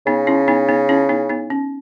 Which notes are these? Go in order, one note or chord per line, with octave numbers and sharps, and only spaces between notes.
C#3 B3 D#4
C#4 E4
B3 D#4
B3 D#4
C#4 E4
B3 D#4
B3 D#4
C#4